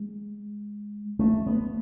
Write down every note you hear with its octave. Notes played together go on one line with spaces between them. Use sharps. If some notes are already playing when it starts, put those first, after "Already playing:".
Already playing: G#3
A3
B3